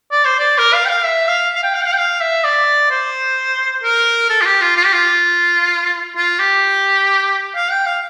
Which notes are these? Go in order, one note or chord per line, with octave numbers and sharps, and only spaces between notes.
D5
C5
D5
A#4
F5
G5
F5
E5
F5
F5
G5
F5
G5
F5
G5
F5
E5
D5
C5
A#4
A4
F4
G4
F4
F4
G4
F4
F4
G4
F5
G5
F5